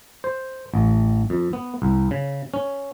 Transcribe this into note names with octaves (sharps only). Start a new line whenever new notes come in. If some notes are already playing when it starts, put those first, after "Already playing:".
C5
A1
F2
B3
C2
C#3
C#4